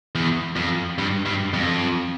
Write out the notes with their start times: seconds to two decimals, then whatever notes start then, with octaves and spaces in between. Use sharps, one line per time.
0.15 E2
0.56 F2
0.98 G2
1.26 G2
1.54 F2